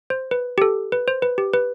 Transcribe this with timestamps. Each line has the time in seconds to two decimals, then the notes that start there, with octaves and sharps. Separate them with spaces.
0.10 C5
0.31 B4
0.58 G4
0.62 A4
0.92 B4
1.08 C5
1.22 B4
1.38 G4
1.53 B4